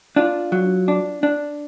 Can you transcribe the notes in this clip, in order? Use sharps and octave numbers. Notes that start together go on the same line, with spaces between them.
D4 F4
F#3
D4
D4